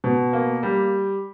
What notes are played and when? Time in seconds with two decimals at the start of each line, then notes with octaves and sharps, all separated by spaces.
0.04 B2
0.33 A#3
0.63 G3